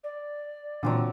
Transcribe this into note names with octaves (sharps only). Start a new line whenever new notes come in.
D5
A#2 D3 E3 F#3 C4 F4